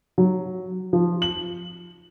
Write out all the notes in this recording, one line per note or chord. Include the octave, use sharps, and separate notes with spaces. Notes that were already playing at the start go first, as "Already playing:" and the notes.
F#3
F3
F#7